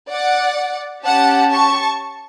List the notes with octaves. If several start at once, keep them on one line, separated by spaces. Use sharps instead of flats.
D5 F#5
C#4 G4 F#5 A5
A5 C#6